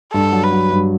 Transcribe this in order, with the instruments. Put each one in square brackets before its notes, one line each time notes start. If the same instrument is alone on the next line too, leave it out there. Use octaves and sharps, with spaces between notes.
[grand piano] G2 [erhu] A4
[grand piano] F#3
[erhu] B4
[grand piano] F#3
G2